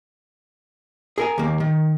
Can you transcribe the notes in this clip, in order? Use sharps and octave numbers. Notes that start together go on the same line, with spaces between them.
G#4 A#4 G#5
D#2 A#3
D#3